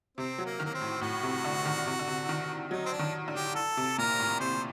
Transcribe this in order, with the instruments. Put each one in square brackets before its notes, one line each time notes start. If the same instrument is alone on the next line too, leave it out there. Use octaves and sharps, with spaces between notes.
[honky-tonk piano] C3 [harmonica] C4
[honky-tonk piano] F#3
[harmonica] A#3
[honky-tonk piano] D#3
[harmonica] A#3
C4
[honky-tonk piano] A2
[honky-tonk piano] A2 [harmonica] F#4
[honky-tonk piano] C3
D3
D#3
C3
D3
C3
D#3
[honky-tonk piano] F#3 [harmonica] D#4
[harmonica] C4
D4
[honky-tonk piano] D#3
D3
[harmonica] G4
A4
[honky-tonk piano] C3
[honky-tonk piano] A#2 [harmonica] A#4
[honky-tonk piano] A2
[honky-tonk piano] C3 [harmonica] C5